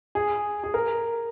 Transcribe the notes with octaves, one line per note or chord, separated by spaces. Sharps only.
G#4
G#4
A#4